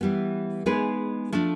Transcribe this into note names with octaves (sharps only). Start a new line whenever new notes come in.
E3 G3 B3
G#3 B3 D#4 G#4 B4
F3 A3 D4